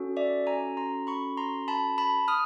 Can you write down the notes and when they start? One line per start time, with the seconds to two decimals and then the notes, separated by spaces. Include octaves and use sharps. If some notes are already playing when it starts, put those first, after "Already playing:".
Already playing: C#4 F#4 A4
0.17 D5 E5
0.47 G#5 A#5
0.77 A#5 C6
1.07 B5 C#6
1.37 A#5 C6
1.68 A5 B5
1.98 A5 B5
2.28 D#6 F6